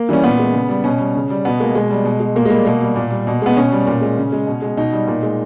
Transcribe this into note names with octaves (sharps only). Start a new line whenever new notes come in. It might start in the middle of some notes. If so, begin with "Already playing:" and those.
Already playing: A#3
E3 G3 C#4
A#2 B3
G#3
C#3
G3
B2 C#4
G3
C#3
G3
B2 B3
G#3 A#3
B2 G#3
G3
B2
G#3
A#2 A#3
G#3
G3 A#3
B2 A#3
G3
A#2
G3
B2
G#3 B3
B2 C#4
G3
A#2
G#3
C#3
G#3
B2
G#3
B2 D#4
G3
A#2
G#3